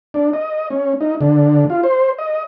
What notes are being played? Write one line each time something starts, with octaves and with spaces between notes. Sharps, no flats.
D4
D#5
C#4
D#4
D3
F4
C5
D#5